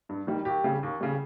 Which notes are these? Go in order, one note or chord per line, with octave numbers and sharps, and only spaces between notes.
G2
D#3 G3
D#2 G4
C#3 G3
D#2
C#3 G3